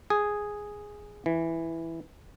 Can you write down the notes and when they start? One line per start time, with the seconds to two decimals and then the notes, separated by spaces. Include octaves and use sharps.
0.10 G#4
1.26 E3